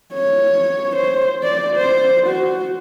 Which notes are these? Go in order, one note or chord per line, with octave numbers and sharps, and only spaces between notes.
C#5
C5
D5
C5
F#4